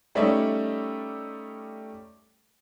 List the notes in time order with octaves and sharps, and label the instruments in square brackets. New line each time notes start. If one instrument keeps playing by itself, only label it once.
[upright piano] G3 A3 C#4 D#4 D5 E5